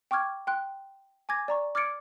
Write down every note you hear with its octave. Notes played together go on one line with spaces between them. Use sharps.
G5 C#6 D6 F6 G#6
G5 C6 F#6
G#5 D6 G#6 A#6
D5 A#5 C#6
D6 F6 G#6 A6 C#7 D7